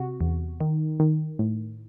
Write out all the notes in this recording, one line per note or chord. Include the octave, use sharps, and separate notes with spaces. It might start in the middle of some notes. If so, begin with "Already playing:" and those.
Already playing: C3 F#4
E2
D#3
D#3
A2